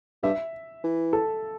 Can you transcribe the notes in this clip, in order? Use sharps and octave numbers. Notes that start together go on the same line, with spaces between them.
G2 E5
E3
A4